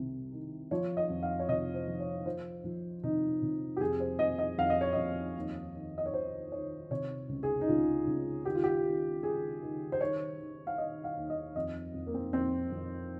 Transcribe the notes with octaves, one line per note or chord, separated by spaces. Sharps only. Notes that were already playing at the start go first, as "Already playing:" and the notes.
Already playing: C2 C3
D#3
F3 C#5
D#5
F2
F5
C#5
C3 D#5
C5
F3
C#5
F3 C5
F3
C3 D#4
C3
G4
F2 G#4
C5
F2 D#5
D#5
F2 F5
D#5
C#5
F2 D#5
D#2
D#3
D#5
C#5
D#3 C5
D#3 C#5
C3 C#5
C#2
G#4
D#4
C#2 F4
C#2
D#3 G4
F4
G4
D#3
D#3 G#4
D#3
C5
D#3 C#5
D#3
F5
D#3 D#5
F5
D#2
D#5
F2 D#5
F2
A#3
C4
F2 C4
F2